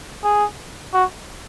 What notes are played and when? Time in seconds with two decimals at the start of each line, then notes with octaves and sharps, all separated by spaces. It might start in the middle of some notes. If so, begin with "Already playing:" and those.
0.24 G#4
0.94 F#4